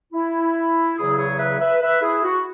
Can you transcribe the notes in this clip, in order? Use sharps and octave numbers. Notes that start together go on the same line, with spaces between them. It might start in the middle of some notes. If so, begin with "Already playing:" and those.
E4
E2 C#3 F#3 E4 G#4
G#4 C#5
B4 E5
B4 E5
B4 E5
E4 G#4
F#4